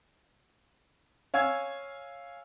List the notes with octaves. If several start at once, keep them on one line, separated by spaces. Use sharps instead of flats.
C#5 F5 G#5 E6 G#6